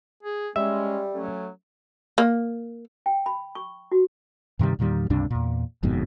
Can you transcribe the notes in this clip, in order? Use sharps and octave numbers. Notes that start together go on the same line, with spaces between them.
G#4
G3 G#3 C#4 E5
F#3 A3 C#4
A#3
G5
B5
C#6
F#4
G2 C3 D#3 G3
E2 A#2 D#3 G3
C#2 G2 C3 D4
E2 A#2
G1 F2 G#2 B2